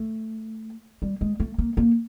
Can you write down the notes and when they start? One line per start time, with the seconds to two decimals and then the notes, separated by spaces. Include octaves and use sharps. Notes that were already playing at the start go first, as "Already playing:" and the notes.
Already playing: A3
1.02 G3
1.21 G#3
1.40 A3
1.58 A#3
1.77 A#3